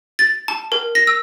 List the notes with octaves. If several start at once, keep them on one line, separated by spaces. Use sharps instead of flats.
A6
A5
A#4
A#6
E6